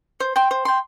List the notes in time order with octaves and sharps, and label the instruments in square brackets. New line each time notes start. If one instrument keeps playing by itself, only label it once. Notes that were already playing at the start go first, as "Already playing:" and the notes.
[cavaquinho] C5
G5 C6
C5
G5 C6